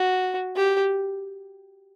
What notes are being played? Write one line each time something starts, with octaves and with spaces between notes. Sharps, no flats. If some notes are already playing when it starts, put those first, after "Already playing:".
Already playing: F#4
G4